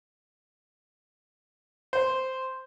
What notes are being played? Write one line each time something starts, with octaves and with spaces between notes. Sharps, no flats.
C5